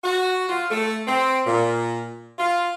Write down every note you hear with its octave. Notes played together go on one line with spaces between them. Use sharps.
F#4
F4
A3
C4
A#2
F4